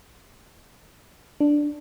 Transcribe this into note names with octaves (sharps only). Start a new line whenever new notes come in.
D4